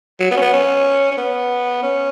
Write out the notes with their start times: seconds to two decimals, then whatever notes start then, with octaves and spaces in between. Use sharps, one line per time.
0.20 F#3
0.31 B3
0.36 C#4
0.42 B3
0.53 C#4
1.11 C#4
1.17 B3
1.83 C#4